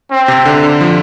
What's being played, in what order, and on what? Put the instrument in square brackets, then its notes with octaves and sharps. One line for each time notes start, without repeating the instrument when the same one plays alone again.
[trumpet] C4
[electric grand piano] C3
D3
D3
F3